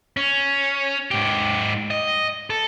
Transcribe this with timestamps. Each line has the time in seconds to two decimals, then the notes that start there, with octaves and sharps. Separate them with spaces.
0.17 C#4
1.11 G#2 G4
1.90 D#5
2.50 A4